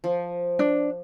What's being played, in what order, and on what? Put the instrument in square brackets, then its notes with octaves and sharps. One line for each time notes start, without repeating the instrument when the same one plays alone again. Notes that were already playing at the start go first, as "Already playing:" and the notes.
[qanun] F3
[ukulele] D4